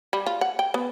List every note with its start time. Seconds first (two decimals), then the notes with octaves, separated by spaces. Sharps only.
0.13 G3
0.26 F4
0.41 F#5
0.59 G5
0.74 B3